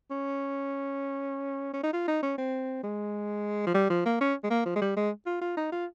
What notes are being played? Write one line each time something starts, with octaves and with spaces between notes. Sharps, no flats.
C#4
C#4
D#4
F4
D#4
C#4
C4
G#3
F3
G3
F3
A#3
C#4
G#3
A#3
F3
G#3
G3
G#3
F4
F4
D#4
F4